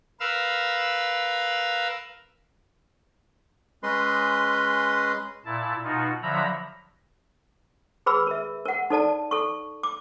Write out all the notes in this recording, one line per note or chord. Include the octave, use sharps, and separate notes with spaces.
A#4 B4 F5 E6
G#3 C#4 B4 D#5 C6
A#2 E4 A5
B2 D#4 F4 F#4
D3 F3 F#3 E5 A#5 B5
G#4 B4 B5 E6
A#4 E5
A#4 F#5
D#4 A4 D5 A5
A4 C#6
D6